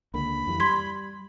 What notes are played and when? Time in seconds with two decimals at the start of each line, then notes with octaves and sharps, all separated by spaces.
0.14 C#2 D3 A#3 B5
0.47 F2 E3 G3
0.60 G3 C6 G#6 B6